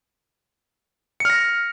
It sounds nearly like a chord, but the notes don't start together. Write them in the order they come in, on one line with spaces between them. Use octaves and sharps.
C#7 F6 A#6